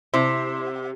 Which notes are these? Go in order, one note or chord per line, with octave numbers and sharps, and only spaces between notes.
C3 E4 C5